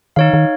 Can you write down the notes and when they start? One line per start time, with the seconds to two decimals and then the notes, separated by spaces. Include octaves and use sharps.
0.16 D#3 D#4 C#5 F5
0.33 D#3